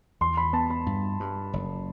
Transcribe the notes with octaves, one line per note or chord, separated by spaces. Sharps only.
E2 C6
B5
B3 A5
B5
G2
G2
F#1